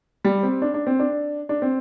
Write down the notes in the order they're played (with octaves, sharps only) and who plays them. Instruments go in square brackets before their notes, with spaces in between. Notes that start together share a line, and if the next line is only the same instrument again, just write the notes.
[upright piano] G3
C4
D4
D4
C4
D4
D4
C4